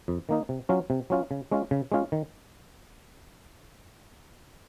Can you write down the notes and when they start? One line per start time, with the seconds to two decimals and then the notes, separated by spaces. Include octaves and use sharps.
0.08 F2
0.29 D#3 A#3 D#4
0.49 C3
0.69 F#3 C#4 F4
0.90 C3
1.10 F#3 C#4 F4
1.31 C#3
1.51 G#3 C#4 F4
1.71 C#3
1.92 G#3 C#4 F4
2.12 D#3